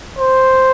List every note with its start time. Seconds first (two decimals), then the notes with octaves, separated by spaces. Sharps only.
0.19 C5